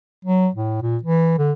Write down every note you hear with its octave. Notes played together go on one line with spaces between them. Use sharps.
F#3
A2
A#2
E3
D3